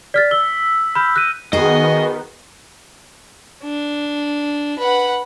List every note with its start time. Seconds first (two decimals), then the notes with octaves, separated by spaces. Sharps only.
0.14 D5 F6 A6 B6
0.31 E6 G7
0.95 B5 F6 G6
1.16 F#6 A#6 D#7
1.53 D#3 B3 F#4 G#4 D#5
3.64 D4
4.79 B4 F#5